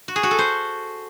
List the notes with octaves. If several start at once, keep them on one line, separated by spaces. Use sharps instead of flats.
F#4
G#4
F#4
A4
C5